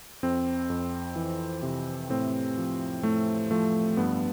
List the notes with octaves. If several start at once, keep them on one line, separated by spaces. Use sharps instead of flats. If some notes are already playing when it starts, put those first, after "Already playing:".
F2 C4
F2
E3
C3
A2 C4
F3
A2 A3
F3 A3
G2 B3